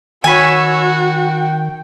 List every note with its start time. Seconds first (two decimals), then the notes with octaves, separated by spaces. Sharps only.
0.24 D#3 F#4 C#5 G#5 B5 E6
0.99 G5